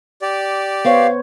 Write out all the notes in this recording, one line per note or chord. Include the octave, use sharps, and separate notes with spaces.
G4 D5
B3 C5 C#5 F5